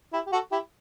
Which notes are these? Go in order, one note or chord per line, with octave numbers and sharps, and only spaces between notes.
E4 G4
G4
F#4 A4
E4 G4